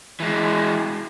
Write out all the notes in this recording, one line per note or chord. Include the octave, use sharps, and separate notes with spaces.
E3 G#3